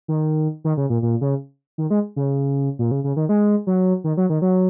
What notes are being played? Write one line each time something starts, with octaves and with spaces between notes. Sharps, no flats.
D#3
D#3
C#3
A#2
A#2
C#3
D#3
G#3
C#3
A#2
C#3
C#3
D#3
G#3
F#3
D#3
F#3
D#3
F#3